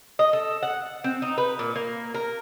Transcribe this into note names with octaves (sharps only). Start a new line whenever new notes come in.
D#5
A4
F#5
C4
D#4
B4
A#2
A#3
A#4